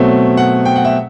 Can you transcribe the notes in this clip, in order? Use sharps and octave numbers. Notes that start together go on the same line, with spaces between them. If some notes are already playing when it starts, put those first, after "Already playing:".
Already playing: B2 F#3 A3 C4
F#5
G5
F#5
E5